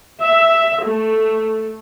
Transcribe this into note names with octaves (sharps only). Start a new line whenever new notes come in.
E5
A3